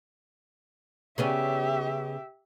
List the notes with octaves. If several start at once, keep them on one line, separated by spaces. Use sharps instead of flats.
C#3 B3 C#4 G4 E5